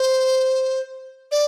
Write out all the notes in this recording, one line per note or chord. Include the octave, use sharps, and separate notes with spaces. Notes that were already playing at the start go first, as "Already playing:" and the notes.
Already playing: C5
D5